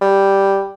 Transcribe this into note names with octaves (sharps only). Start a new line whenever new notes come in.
G3